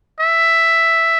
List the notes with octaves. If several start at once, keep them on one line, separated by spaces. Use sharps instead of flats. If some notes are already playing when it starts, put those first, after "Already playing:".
E5